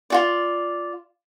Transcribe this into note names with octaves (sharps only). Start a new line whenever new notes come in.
F4 F#4 D5